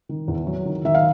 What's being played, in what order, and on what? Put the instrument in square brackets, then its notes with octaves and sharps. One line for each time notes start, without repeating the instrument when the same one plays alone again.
[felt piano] D#3
E2
F#3
D#3
D#3 E5
F5